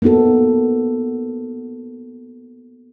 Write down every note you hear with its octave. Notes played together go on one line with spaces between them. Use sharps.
A#3 B3 D#4 F#4 A4